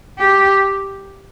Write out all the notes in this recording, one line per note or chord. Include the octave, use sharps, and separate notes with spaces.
G4